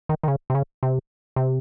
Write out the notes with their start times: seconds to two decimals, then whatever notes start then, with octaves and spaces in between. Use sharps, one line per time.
0.09 D#3
0.23 D#3
0.28 C#3
0.50 C3
0.55 C#3
0.83 C3
1.36 C3